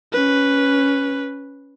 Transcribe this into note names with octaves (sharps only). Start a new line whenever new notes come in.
C#4 B4